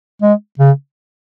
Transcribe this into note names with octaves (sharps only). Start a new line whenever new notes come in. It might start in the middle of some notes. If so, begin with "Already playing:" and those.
G#3
C#3